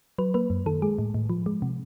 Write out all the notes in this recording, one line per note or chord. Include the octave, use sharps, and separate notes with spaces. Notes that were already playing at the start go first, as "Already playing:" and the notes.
F#3 B4
A#3 B4
F#2
D#3 A4
G#3 G#4
A2
A2
F3
G#3
C3